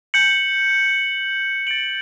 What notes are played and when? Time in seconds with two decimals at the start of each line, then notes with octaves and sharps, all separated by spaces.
0.14 G6 C#7 F#7
1.67 A6 D7 F#7